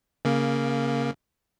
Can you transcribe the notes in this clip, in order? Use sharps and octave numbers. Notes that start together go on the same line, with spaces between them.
C#3 A#3